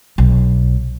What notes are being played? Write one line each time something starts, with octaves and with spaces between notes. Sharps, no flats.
B1